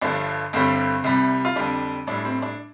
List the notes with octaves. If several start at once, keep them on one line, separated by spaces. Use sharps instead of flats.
G1 G2 D3 F3 D4
G1 G2 D3 G3 C4
C2 C3 G3
F4
F2 D3 G3 D4
A1 A2 G3 D4
C4
D4